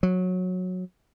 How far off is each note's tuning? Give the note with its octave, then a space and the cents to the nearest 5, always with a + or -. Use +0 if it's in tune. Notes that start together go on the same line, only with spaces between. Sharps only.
F#3 -15